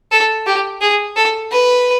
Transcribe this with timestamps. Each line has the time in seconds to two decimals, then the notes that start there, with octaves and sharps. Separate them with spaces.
0.11 A4
0.46 G4
0.81 G#4
1.16 A4
1.51 B4